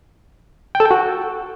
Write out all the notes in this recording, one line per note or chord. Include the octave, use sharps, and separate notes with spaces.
G5
A4
G5
F#4